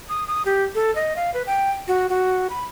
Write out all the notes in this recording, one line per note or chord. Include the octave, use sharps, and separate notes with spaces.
D#6
D#6
G4
A4
D#5
F5
B4
G5
F#4
F#4
B5